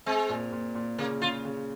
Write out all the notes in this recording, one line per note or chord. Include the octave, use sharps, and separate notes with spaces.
G#3 C4
A#2
A#2
A#2
C#3 A#3
C#3 F4
C#3